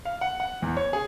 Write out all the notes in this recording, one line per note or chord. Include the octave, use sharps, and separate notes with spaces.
F5
F#5
F#5
E2
C#5
G#4